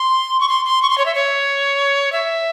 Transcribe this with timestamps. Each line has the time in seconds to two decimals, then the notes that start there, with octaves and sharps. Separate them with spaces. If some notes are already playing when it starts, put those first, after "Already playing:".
Already playing: C6
0.40 C#6
0.49 C6
0.65 C6
0.82 C#6
0.90 C6
0.98 C#5
1.06 E5
1.15 C#5
2.12 E5